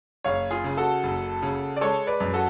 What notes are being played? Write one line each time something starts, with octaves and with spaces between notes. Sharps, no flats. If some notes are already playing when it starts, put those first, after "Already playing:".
F#1 C#5 F5
F4 G#4
C#3
F#4 A4
F#1
C#3
D5
G#3 A4 C#5
B4 D5
F#2
F#4 A4